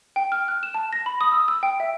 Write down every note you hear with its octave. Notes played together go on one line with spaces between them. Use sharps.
G5
F6
F#6
E7
A5
A#6
B5
D#6
E6
E6
G5
E5